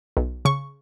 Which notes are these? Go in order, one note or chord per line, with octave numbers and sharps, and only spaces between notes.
B1
C#3 C#6